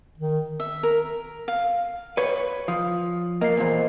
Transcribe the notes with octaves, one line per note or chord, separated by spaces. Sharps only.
D#3
E5
A#4
F5
B4 C#5
F3 D#6
A#3 D#5 C7
E2 A#2 A#4 C5